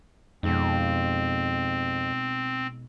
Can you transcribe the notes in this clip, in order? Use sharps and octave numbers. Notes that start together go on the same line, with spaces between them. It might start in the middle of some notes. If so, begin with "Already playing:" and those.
F2 B2 G#3 C4 D#4